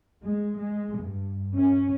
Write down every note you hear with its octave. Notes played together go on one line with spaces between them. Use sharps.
G#3
G#3
G2
C#4